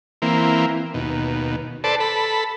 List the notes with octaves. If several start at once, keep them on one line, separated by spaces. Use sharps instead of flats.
E3 A#3 C4
D#2 B2
A4 B4 C5 D5 A5
A4 B5